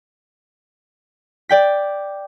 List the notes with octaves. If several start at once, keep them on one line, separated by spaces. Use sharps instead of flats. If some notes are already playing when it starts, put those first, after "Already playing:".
D5 G5 B6